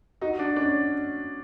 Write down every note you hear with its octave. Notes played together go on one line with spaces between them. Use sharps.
D#4 F#4
D4
C#4 D4